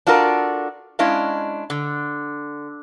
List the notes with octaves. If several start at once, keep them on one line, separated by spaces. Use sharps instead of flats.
D4 F4 F#4 A4 A#4
G#3 C#4 D4 E4 D#5 F5
D3